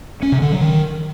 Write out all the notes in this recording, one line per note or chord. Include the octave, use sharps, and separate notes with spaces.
C#4
C3
D3
F#3
D#3